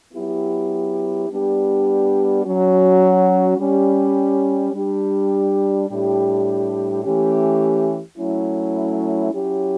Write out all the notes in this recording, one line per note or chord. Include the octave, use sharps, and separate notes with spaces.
F#3 B3 E4 G4
G3 B3 D4 G4
F#3 C#4 F#4
G3 C#4 G4
G3 D4 G4
A2 G3 D4 G4
E3 A3 C#4 G4
F#3 A3 C#4 E4
F#3 C#4 E4 G4